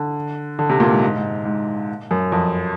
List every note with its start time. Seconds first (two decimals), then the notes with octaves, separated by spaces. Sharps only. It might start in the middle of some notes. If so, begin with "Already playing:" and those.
Already playing: D3
0.59 D3
0.69 C3
0.80 A#2
0.91 G#2
1.02 G#2
1.17 G#2
1.45 G#2
2.11 F#2
2.32 F2